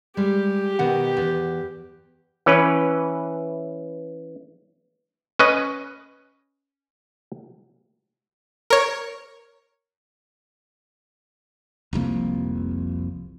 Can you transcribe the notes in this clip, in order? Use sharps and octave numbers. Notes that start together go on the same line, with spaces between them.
G3 G#3 G4
B2 D#3 F#5
E2
E3 C#4 B4
C#4 B4 D#5
A#4 C#5
F1 C2 F2 A#3